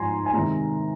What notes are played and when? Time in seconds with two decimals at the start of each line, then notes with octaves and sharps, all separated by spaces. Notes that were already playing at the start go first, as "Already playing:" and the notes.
Already playing: G#2 F3 G#3 G#5 A#5 C6
0.26 G#5
0.33 C3 D#3 G#3 A#5